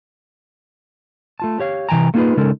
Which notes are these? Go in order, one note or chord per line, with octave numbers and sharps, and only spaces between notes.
A3 F4 A5
G4 C#5 F5
C3 E3 G5 G#5 A#5
A3 A#3 D#4 F4 G#4 B4
C#3 G#3 C#4 D#4 A4 A#4